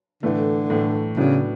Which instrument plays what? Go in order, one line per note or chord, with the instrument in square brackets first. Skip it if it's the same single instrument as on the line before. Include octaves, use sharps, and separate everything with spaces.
[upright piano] A2 E3 A3 [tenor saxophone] D3
[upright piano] A2 E3 A3
[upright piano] A2 F#3 B3 D4 [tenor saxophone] C#3